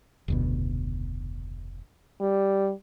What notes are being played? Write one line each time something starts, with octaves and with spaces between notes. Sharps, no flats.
F1 D2 B2
G3